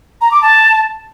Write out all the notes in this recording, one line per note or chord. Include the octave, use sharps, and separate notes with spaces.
A#5
D6
A5